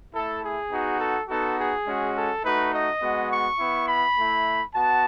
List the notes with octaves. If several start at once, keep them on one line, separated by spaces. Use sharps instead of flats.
A3 E4 A4
G#4
B3 D#4 F#4
A4
B3 D#4 F#4 A4
G#4
G#3 C#4 F#4
A4
A3 D#4 F#4 B4
D#5
G#3 B3 F#4
C#6
B3 E4
B5
A3 E4
B3 F#4 A5